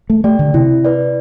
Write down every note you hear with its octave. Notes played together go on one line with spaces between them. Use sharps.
A3
A3 G4 D5 G5
D3
C3 E4
B4 D5